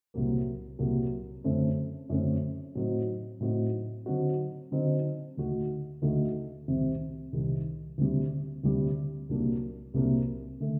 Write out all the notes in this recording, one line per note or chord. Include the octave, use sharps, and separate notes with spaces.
C2 C3 F#3 A#3
C2 C3 F#3 A#3
F#2 D3 A3 C4
F#2 D3 A3 C4
A2 F#3 C4 D#4 F#4
A2 F#3 C4 D#4 F#4
D3 F#3 C4 D#4 F#4
D3 F#3 C4 D#4 F#4
D2 D3 A3 D#4 F#4
D2 D3 A3 D#4 F#4
C2 C3 D#3
C2 C3 D#3
D2 C3 G3
D2 C3 G3
C2 C3 F#3 A#3 D4
C2 C3 F#3 A#3 D4
D3 A3